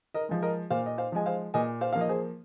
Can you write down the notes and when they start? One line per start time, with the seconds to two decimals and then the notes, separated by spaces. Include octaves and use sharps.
0.14 A#4 D#5
0.29 F3 G#3
0.42 A#4 D#5
0.70 A#2 C5 F5
0.86 D#5
0.98 C5 F5
1.12 F3 G#3 G#5
1.26 C5 F5
1.54 A#2 D#5 G#5
1.81 C5 F5
1.93 F3 A#3 F5
2.01 D#5
2.09 G#4 C5